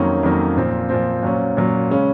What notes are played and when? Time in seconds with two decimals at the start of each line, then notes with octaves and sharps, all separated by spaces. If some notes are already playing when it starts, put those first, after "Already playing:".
Already playing: F2 D#3 F#3 A#3 C#4
0.23 F2 D#3 F#3 A#3 C#4
0.56 A#2 F3 C4
0.89 A#2 F3 C4
1.22 A#2 F#3 C#4
1.57 A#2 F#3 C#4
1.90 C#3 G#3 C#4